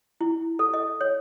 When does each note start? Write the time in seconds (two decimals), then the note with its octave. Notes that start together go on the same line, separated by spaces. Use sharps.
0.21 E4
0.59 A4
0.74 D#5
1.01 C#5